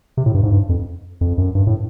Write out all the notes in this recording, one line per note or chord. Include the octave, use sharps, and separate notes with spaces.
C3
A2
G2
G#2
G2
F2
F2
F#2
G2
A2